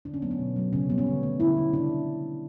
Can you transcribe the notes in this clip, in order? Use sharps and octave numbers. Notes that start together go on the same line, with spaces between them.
D3 D4
C#4
F#3 A3 B3
C#4
B2
F#3 A3
C#3 C#4
G3 B3
C#4
D3
A3
D3 E4
A3
C#3 D4